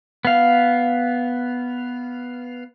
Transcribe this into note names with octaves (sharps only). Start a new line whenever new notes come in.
B3 F5